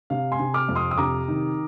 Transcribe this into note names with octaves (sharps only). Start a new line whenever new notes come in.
C3 F5
G#5 C6
C3
D6 F6
F2
C6 D#6
D#6
C3 A#5 D6
D#3